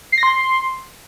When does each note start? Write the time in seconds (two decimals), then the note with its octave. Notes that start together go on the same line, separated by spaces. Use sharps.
0.12 C7
0.18 A#6
0.23 C6